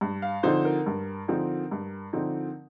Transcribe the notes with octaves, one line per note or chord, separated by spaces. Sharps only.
G2
F5
D3 F3 C4 D#4 C5
A#4
G2
D3 F3 C4 D#4
G2
D3 F3 C4 D#4